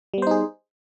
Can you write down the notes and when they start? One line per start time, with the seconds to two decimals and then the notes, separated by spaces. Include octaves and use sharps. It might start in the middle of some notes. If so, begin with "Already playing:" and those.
0.14 G3
0.18 B3
0.22 C5
0.27 D#4
0.31 G#4